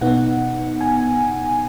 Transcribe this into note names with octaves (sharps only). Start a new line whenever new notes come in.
B2 B3 D#4 F#5
G#5